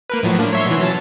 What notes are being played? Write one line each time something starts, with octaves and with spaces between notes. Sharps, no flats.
A#3 A#4 B4
A2 F3 F#3
A#3 D4
C#5 E5 C6
B2 E3
F#3 C#4 A5